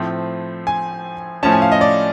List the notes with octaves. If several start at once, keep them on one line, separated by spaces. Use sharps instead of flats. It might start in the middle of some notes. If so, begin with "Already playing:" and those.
Already playing: A2 F3 A3 C4
G#5
A2 F3 A3 C#4 A5
G#5
F5
D#5
D5